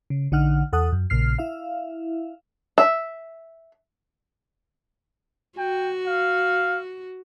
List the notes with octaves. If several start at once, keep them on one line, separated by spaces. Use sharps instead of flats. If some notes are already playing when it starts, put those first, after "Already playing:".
C#3
A#1 D3 D#4 F#5 F6
E2 A4 F#5 D#6
F#2
A#1 A#2 C#3 F6 C7
E4 E5 F5
E5
F#4 G5
F5